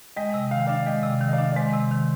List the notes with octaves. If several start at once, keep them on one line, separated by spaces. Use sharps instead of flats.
G#3 D#5 G5
C3
D#3 F5
G5
D4 D5 F5
G#3 D#5 G5
C3
D#3
D#5
D5 F5
D4
D5
G#3 C5 D#5
C3
D#3